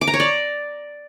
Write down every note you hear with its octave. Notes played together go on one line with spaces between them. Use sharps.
D6
A#5
C#5
D5